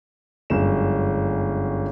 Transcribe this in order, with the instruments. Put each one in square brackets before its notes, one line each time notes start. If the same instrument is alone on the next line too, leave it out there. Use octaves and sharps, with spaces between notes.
[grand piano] G1 F#2 G#3 C#4 E7